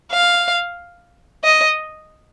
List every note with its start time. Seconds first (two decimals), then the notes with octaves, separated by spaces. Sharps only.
0.12 F5
1.44 D#5